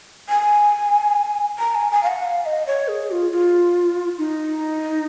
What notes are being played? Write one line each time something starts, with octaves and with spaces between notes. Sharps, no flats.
G#5
A#5
G#5
G#5
F5
F#5
F5
D#5
C#5
G#4
F4
F4
D#4